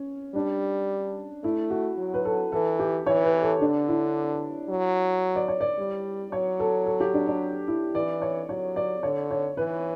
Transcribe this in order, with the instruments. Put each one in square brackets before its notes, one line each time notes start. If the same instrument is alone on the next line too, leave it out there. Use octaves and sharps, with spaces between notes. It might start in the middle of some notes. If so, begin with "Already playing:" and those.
Already playing: [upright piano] C#4
[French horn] G3 [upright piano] D4
[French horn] A3 [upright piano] E4
[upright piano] F#4
[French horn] F#3
[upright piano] B4
A4
[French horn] E3 [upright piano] A4
[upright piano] G4
[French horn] E3 [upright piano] C#5
[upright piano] B4
A4
[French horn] D3 [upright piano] D4
[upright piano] E4
[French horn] F#3
[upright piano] D5
C#5
D5
[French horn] G3
[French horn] F#3 [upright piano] C#5
[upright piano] A4
A4
G4
D4
D4
E4
[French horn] E3 [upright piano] D5
[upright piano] C#5
[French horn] F#3 [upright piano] C#5
[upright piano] D5
[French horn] D3 [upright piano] C#5
[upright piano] C#5
[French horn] E3 [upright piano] B4